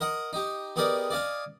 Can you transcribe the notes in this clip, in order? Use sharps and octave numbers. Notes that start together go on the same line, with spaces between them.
A#4 D#5 F#5
D#4 G4
B3 G4 G#4 A#4 D5 D#5
D5 D#5 F5 G#5